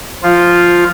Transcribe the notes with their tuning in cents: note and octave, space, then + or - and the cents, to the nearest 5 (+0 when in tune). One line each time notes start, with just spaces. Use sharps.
F3 +0 F4 +0